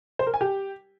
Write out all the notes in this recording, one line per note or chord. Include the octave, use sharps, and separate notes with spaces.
C5
A#4
G#5
G4